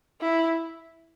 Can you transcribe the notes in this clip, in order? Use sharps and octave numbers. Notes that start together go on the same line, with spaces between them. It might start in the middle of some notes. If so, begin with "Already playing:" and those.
E4